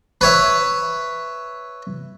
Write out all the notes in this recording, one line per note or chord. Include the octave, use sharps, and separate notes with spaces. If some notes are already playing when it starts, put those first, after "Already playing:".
B4 C#5 E5